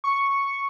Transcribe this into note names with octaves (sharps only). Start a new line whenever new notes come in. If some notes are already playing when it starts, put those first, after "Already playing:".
C#6